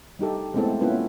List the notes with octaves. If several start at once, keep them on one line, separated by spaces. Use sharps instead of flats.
G3 D#4 G4 A4
G#3 A3 B3 C4 E4 A4
A#3 B3 C#4 E4 F4 B4